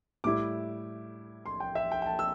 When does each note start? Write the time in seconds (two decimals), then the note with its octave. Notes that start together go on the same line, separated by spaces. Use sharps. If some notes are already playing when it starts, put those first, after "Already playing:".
0.24 A2 G3 E4 D6
1.46 C6
1.60 G5
1.75 E5
1.92 G5
2.02 G5
2.06 A5
2.19 E6